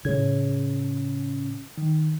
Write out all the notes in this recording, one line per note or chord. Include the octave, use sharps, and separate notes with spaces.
A2 C#3 G#6
D#3